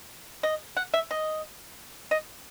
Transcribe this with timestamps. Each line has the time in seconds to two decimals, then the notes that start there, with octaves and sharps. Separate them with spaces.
0.43 D#5
0.77 F#5
0.94 E5
1.11 D#5
2.11 D#5